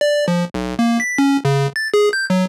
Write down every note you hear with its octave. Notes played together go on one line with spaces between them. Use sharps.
D5
F3
B1
A#3
B6
C#4
C#3
A6
G#4
G6
F#3